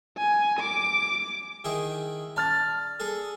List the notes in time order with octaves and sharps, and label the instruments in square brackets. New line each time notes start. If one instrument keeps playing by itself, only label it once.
[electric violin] G#5
D6
[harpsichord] D#3 E4 G#4
[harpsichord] D5 [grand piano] A5 F6 A6
[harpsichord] G#4 A4